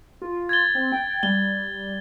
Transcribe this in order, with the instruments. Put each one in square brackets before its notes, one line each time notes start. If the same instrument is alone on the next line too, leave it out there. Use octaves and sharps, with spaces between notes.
[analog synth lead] F4
[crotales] G#6 A6 G7
[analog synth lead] C4
G5
[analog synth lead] G3 [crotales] G7